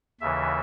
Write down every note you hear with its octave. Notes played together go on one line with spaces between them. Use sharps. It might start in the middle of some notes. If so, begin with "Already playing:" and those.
D#2 C#3 E3 E5